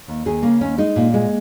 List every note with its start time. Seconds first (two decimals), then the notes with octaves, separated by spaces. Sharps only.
0.08 D#2
0.26 D#2 G#4
0.43 C#3 A#3
0.61 D#2 C#4
0.78 G#3 D#4
0.96 A#2
1.14 G#3